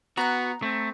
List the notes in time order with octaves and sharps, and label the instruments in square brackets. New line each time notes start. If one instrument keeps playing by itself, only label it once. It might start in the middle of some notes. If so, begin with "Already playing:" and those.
[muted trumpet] B3 [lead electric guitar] F#4 [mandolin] A#5 F#6
[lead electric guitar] A3 [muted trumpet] C4